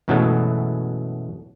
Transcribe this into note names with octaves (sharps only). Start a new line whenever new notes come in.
F#2 B2 E3 F#3 G#3 A3